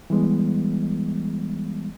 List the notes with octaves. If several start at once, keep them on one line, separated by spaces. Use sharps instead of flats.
E3 G3 G#3 B3